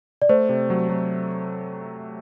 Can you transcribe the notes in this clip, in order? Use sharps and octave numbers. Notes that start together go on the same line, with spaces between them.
D5
A3 C5
C3
F#3
F#3